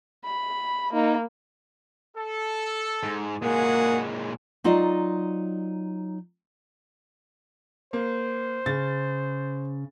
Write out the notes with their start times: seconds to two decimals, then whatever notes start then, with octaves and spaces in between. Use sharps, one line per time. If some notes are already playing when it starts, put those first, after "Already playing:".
0.25 B5
0.93 A#3 D#4
2.17 A4
3.03 G#2
3.42 A#2 G#3 A#3 F#4 G#4 F#5
4.64 F#3 D#4 F4 C5 D5 D#5
7.93 A#3 C5
8.66 C#3 A6